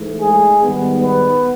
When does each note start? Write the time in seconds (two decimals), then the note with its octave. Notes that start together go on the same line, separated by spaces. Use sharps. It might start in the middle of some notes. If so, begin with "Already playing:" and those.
Already playing: G#2 E3 A3
0.20 G#3 G#4
0.61 G#2 D#3 G3 B3
1.01 B3 B4